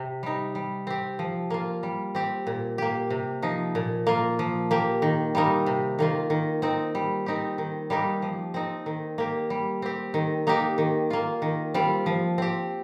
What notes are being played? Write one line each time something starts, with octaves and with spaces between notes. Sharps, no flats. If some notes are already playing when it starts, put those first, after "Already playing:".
Already playing: C3 G4
G3 D#4
G3
C4 G4
F3
A#3 F4
G3
C4 G4
A#2
A#3 G4
C3
F3 D#4
A#2
A#3 F4
F3
A#3 G4
D#3
G3 A#3 D#4
C3
D#3 A#3 F4
D#3
C4 D#4
G3
C4 D#4 G4
D#3
G3 A#3 D#4 G4
F3
C4 D#4
D#3
A#3 G4
G3
C4 G4
D#3
A#3 D#4 G4
D#3
A#3 F4
D#3
G3 C4 F4
F3
C4 G4